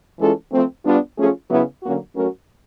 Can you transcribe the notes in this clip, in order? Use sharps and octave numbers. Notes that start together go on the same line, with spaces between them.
E3 G#3 C#4 F4 A4
F3 A3 C4
G3 B3 D4 F4
F3 A3 C#4 F4 G#4
C#3 F#3 B3 E4
D3 F#3 A#3 C#4 F#4
F#3 A3 C#4 F#4 A#4